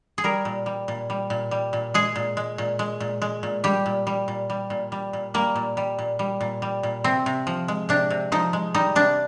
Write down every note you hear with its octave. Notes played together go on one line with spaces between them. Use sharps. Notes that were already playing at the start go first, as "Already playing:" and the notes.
G#4
G3 A#4
A#2
G3
A#2
G3
A#2
G3
A#2
G#3 G#4
A#2
G#3
A#2
G#3
A#2
G#3
A#2
G3 G4
A#2
G3
A#2
G3
A#2
G3
A#2
G3 A#3
A#2
G3
A#2
G3
A#2
G3
A#2
C3 C4
C3
F3
G#3
C3 D4
C3
F3 D#4
G#3
G3 D#4
C3 D4